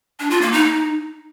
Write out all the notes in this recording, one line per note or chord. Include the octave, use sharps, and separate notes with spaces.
D4
F4
A#3
D#4